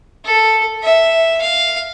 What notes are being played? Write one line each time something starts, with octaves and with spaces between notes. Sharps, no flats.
A4
E5
F5